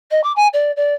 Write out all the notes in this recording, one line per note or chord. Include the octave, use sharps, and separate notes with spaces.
D#5
D6
G#5
D5
D5